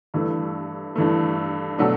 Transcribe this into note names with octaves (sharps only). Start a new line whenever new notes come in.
G2 E3 A3
G2 E3 A3
B2 F#3 A3 D4